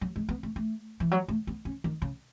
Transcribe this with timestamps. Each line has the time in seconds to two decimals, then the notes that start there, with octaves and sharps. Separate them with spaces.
0.01 F#3
0.16 G#3
0.29 B3
0.43 A3
0.56 A3
1.00 E3
1.11 F#3
1.28 A3
1.47 B3
1.65 C#4
1.84 D#3
2.02 C#3